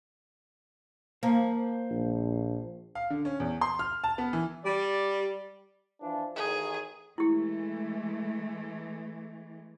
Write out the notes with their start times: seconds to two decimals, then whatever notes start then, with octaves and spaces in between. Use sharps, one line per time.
1.23 A#3 C5 A5
1.90 A#1
2.95 F5
3.10 D3
3.25 C#4
3.40 E2
3.61 C6
3.79 F6
4.04 A5
4.18 B3
4.33 E3
4.64 G3 D5
6.01 E3 F3 D4
6.36 A1 D#3 G#4
7.18 E3 G#3 A3 E4 G4